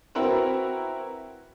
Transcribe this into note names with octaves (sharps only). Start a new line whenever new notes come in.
C4 E4 F#4 A#4 B4